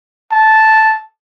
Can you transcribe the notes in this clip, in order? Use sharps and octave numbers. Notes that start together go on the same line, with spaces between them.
A5